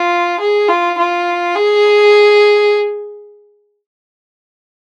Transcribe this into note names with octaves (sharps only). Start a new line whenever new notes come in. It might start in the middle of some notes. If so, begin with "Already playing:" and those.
Already playing: F4
G#4
F4
F4
G#4